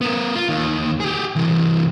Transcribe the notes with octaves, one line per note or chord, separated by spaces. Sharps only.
B3 A#4
F4
D#2 D#3
G4 G#4
C3 E3